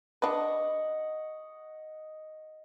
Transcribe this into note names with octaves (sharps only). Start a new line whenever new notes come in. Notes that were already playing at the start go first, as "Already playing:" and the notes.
D4 B4 D#5 F#5 C#6